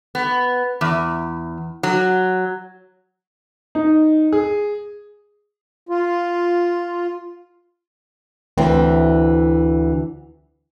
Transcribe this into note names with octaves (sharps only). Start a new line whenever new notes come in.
B3
E2
F#3
D#4
G#4
F4
D2 E3 C4